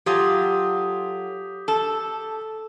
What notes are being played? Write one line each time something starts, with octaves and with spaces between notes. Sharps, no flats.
F#3 F4 G4 A4 D#6
A4